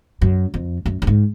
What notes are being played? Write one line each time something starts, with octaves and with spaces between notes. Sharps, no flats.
F#2
F2
F#2
F#2
G#2